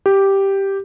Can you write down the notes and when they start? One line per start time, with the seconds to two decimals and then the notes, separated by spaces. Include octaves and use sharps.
0.06 G4